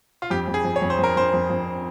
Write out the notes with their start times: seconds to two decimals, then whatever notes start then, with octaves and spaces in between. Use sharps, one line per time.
0.22 F4
0.30 F2 G4
0.48 F2
0.54 G#4
0.64 F2
0.76 C#5
0.82 F2
0.90 C5
0.98 F2
1.04 A#4
1.16 F2 C5
1.33 F2
1.50 F2